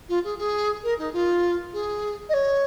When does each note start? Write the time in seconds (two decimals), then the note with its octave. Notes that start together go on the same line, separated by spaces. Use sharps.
0.09 F4
0.24 G#4
0.38 G#4
0.83 A#4
0.98 D#4
1.13 F4
1.73 G#4
2.29 D#5
2.33 C#5